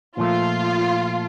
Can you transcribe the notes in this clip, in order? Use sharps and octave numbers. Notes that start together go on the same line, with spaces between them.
A#2 F3 A3 F4